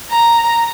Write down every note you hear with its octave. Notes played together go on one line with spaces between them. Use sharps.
A#5